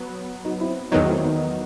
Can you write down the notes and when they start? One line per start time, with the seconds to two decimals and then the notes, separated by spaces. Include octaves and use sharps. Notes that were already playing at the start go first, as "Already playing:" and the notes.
Already playing: F#3 B3
0.45 D#4 F#4
0.60 C4 E4
0.92 E2 D#3 F#3 B3 D#4
1.08 A3 C4
1.23 B3 D#4